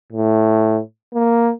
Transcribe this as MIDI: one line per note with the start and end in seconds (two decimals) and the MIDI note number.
0.12 0.80 45
1.14 1.52 58